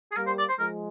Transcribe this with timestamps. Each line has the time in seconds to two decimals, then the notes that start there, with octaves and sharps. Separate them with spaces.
0.11 G#4
0.16 G3 A#3 A#4
0.27 C5
0.38 D5
0.49 C5
0.59 F3 G#3 A#4